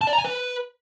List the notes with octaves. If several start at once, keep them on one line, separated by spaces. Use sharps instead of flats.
A5
D5
A#5
G#5
B4